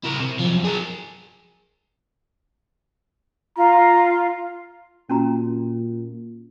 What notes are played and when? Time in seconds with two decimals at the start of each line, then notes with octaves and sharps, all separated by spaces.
0.05 E4 A#4
0.20 C3
0.40 F#2 F3
0.65 G#4 A#4
3.57 F4 A#5
5.10 A#2 C#4 F#4 A#5